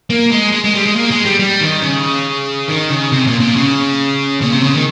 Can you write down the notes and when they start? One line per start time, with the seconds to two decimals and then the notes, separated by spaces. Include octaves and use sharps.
0.10 A#3
0.32 G#3
0.52 G#3
0.64 G#3
0.75 G3
0.85 G#3
0.96 A#3
1.11 G#3
1.25 G3
1.40 G3
1.61 D#3
1.83 C#3
2.69 D#3
2.91 C#3
3.12 C3
3.27 A#2
3.40 A#2
3.55 C#3
4.41 A#2
4.52 C3
4.63 C#3
4.74 D#3